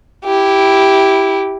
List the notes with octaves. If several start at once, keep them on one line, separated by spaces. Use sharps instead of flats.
E4 G4